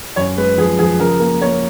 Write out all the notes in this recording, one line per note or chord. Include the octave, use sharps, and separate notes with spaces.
F#2 C#5
G#3 B4
F3 G#4
F3 G#4
C#3 A#4
A#3
A#3 C#5